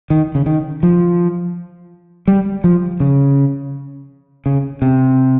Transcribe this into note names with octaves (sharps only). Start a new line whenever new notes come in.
D#3
C#3
D#3
F3
G3
F3
C#3
C#3
C3